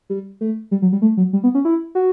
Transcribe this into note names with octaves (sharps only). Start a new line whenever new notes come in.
G3
A3
G3
F#3
G3
A3
F#3
G3
B3
C#4
E4
F#4